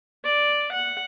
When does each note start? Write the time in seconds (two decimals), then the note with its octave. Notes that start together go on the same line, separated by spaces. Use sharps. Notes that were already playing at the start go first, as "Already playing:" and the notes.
0.24 D5
0.72 F#5